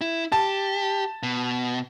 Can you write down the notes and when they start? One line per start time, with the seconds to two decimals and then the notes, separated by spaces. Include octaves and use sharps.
0.01 E4
0.32 G4 A5
1.23 B2